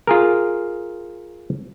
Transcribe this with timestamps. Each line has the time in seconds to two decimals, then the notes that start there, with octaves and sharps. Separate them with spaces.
0.07 F4 G#4 A#4